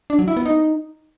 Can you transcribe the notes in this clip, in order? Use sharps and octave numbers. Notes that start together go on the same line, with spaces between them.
D4
F#3
E4
B3
D#4